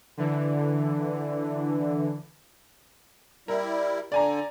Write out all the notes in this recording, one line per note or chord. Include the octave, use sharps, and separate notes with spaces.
D3 E3
G3 E4 A#4
D3 D5 G#5 A#5